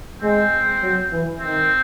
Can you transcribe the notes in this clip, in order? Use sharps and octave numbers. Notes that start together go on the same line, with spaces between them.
G#3 C4
F#3
E3
D#3 C4